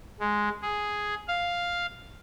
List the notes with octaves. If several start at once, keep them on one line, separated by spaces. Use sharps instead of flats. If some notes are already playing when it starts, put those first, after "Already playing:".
G#3
G#4
F5